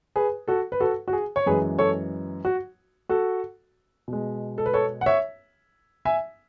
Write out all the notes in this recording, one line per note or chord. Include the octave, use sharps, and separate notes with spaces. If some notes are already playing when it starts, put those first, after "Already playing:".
G#4 B4
F#4 A4
B4
F#4 A4
F#4
G#4
C#5
F#2 E3 G#3 G#4 B4
A4 C#5
F#4
F#4 A4
B2 G#3
A4
B4
A4 C#5
F#5
C#5 E5
E5 G#5